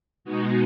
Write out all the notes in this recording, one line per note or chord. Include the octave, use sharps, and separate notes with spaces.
B2 G#3 B3 D#4 F#4